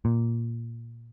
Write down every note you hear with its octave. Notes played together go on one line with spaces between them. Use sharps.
A#2